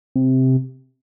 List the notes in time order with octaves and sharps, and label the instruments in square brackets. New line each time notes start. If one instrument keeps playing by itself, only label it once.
[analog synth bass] C3